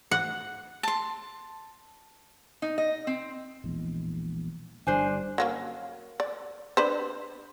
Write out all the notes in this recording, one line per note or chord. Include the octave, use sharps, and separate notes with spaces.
F#5
A5 C6
D#4
D#5
C4
E1 A#1 E2
G1 G3 D4 C5 G#5
F#3 A#3 C#4
D5
D4 B4 C5